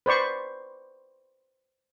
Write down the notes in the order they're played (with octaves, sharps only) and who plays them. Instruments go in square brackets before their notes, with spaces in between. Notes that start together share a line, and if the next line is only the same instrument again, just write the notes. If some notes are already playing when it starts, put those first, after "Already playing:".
[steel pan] B4 C5 D5 C#6